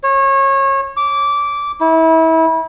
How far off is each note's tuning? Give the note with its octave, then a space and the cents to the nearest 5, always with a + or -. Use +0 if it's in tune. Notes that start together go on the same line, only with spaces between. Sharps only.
C#5 -30
D6 -15
E4 -30